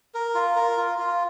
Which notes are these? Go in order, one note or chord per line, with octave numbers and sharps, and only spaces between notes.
A#4
F4
A#4
F4
F4